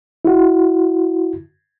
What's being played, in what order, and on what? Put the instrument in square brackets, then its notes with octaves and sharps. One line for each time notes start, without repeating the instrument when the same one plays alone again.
[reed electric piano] E4 F#4